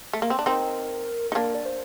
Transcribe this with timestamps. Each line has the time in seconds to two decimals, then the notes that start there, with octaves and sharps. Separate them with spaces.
0.13 A3
0.22 A#3
0.30 C4
0.39 D4
0.46 C4 D#4 A#4
1.32 D#4
1.35 A#3 D4 A#4
1.55 D5
1.65 C5